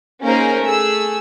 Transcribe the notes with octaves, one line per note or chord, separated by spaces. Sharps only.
A#3 C#4 D#4 G#4 A#4 C5
A3 G#4 E6